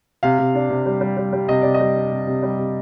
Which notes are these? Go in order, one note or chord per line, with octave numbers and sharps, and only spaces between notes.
C3 F5
C3
D4
C3
G3
G3
G3
G3
C3 D#5
C3 D5
D#5
G3
D4
C3
C3
G3
C3